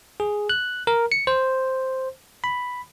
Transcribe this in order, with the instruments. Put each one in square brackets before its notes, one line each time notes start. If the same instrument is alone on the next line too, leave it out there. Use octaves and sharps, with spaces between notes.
[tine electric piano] G#4
F#6
A#4
C#7
C5
B5